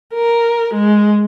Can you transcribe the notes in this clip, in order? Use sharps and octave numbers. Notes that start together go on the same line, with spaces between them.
A#4
G#3